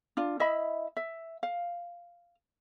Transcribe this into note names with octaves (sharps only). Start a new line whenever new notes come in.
D4 F4
E4 D#5 E5 B5
E5
F5